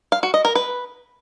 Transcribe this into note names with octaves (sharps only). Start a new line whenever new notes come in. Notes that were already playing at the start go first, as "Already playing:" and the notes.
F5
F#4
D#5
A#4
B4